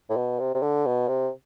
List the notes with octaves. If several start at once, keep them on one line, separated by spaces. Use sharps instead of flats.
A2
B2
C3
C3
D3
B2
C3